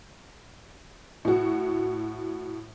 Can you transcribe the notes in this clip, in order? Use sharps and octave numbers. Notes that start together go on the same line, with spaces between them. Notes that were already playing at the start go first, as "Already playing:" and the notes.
A2 F#4